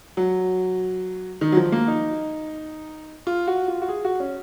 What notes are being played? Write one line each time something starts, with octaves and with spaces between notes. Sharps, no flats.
F#3
D#3
F#3
F3
A#3
D#4
F4
F#4
F4
F#4
G#4
F#4
C#4